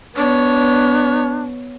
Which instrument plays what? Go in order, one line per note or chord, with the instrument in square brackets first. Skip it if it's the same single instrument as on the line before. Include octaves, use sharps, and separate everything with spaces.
[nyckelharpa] B3 C#5 [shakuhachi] D4